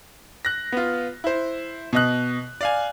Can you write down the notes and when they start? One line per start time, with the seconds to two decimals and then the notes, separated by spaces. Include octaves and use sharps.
0.45 F#6 A#6
0.72 B3 F4
1.24 E4 C5
1.93 B2 D#5 F#6
2.61 D5 F5 G#5